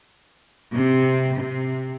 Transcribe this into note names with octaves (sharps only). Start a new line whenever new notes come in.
C3
C3